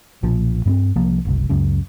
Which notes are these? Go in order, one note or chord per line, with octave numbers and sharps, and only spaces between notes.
B1 A#2 F3
G2 A#3 C4
C2 F3 A#3
F#1 C2
C#2 F#2 C#3